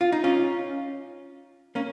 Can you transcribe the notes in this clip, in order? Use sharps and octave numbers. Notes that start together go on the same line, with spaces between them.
F4
D#4
C#4 F4
A#3 C#4